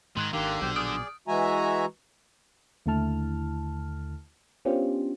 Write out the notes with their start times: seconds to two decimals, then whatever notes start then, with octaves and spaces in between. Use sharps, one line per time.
0.17 G#2 D#3 C6 F#6 G#6
0.33 G#1 D3 D#3 A#3 G4
0.61 A#1 B2 F#3 G4 C5
0.76 G#4 D5 D#6 F6 D7
1.28 E3 G#3 F#4 E5 G#5 A#5
2.86 D#2 D3 A3 E4 A5 F6
4.65 B3 C#4 D4 F4 G4 C5